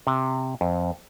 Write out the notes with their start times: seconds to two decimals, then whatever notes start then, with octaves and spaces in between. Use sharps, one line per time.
0.07 C3
0.61 F2